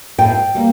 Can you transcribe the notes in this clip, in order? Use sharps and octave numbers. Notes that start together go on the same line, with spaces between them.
A2 G5
G3 A#3